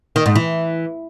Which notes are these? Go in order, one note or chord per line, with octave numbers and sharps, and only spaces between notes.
D#3
G#2
E3